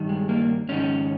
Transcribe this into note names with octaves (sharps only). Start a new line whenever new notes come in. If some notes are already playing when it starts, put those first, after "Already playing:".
Already playing: G2 D#3
G#3
A#3
G#2 D#3 C#4